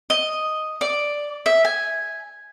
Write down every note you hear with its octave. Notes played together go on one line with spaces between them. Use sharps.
D#5
D5
E5
G#5